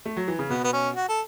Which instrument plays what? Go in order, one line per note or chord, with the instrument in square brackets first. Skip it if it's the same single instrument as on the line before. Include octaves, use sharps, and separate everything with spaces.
[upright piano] A3
F#3
E3
C#3
[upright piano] B2 [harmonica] B3
[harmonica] B3
C#4
F#4
A4